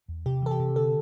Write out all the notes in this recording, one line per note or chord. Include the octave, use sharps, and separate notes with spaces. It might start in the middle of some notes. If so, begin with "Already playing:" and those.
E2
C3 G4
E3 A4
G4
C3
D3 A4